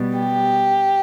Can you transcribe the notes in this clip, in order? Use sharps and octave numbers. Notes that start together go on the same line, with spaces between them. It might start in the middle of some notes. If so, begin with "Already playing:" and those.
Already playing: B2 G3 B3
G4